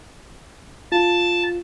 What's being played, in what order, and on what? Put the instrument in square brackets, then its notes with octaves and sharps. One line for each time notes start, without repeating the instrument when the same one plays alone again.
[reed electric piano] F4 [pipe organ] A5